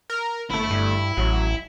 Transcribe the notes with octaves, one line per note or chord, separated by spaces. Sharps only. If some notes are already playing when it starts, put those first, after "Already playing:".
A#4
G1 A3 E4
G2
A1 F#3